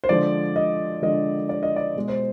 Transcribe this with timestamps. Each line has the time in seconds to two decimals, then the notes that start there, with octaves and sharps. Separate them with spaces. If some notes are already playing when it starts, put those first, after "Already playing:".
0.04 C5
0.09 D3 F3 G#3 D5
0.56 D#5
1.02 D3 F3 G#3 D#5
1.49 D5
1.63 D#5
1.76 D5
1.95 B2 G#3
2.08 C5